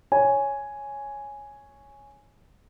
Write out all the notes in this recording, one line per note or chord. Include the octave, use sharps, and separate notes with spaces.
C#5 G#5